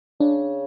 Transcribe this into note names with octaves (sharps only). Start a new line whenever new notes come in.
C#3 D4